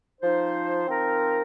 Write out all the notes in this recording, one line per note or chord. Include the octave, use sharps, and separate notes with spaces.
F3 D#4 C5
F3 C4 D#4 A#4